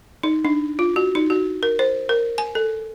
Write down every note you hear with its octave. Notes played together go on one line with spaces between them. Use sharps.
D#4
D4
F4
F#4
D#4
F#4
A#4
C5
A#4
G#5
A4